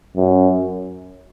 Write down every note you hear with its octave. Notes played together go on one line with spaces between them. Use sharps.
F#2